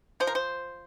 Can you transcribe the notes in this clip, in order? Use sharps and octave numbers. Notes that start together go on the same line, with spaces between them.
F3 C5
A#4
C5